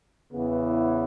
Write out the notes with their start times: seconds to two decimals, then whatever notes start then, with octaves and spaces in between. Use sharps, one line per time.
0.32 E2 C#3 E3 B3
0.66 E4